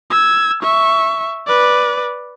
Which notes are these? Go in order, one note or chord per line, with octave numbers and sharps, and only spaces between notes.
E6 G#6
E5 C#6
B4 D5